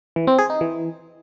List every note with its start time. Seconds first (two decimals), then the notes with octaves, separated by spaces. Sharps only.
0.16 E3
0.27 C4
0.39 G#4
0.50 D#4
0.61 E3